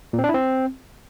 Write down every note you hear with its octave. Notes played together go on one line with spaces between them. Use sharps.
A#2
C4
D4
E4
C4